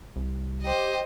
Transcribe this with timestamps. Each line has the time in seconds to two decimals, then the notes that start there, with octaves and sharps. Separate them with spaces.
0.16 C2
0.62 G4 C5 D#5